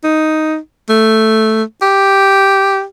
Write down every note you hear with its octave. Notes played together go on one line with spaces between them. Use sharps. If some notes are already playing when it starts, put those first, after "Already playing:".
D#4
A3
G4